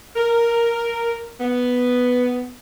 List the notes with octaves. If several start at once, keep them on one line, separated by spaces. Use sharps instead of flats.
A#4
B3